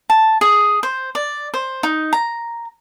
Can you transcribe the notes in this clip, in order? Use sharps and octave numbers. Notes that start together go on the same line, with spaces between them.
A5
G#4
C5
D5
C5
D#4
A#5